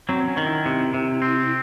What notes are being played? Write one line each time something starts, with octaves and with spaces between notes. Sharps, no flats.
F#3 C4
C#4
D#3
E4
C3
C3
C4